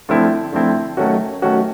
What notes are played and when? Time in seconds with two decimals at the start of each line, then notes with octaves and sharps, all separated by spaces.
0.09 D3 F3 A3 C4 E4
0.52 D3 F3 A3 C4 E4
0.97 D#3 F#3 A3 C#4 F#4
1.42 D#3 F#3 A3 C#4 F#4